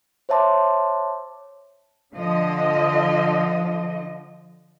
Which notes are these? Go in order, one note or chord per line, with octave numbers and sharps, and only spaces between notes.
C5 C#5 E5 A5 C6 D6
D3 F3 D#5